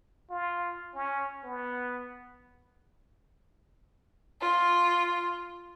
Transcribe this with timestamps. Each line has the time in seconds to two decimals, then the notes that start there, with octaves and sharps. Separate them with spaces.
0.30 F4
0.94 C#4
1.44 B3
4.41 F4